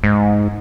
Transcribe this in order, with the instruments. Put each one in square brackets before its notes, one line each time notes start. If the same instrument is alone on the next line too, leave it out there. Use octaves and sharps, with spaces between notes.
[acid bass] G#2